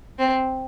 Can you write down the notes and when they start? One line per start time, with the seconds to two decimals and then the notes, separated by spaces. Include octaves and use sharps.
0.19 C4